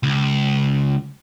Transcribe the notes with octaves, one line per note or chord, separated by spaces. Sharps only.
C#2